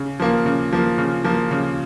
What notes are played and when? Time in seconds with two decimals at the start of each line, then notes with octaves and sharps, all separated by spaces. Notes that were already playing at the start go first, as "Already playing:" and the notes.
Already playing: C#3
0.20 F3 A#3
0.45 C#3
0.73 F3 A#3
0.98 C#3
1.24 F3 A#3
1.51 C#3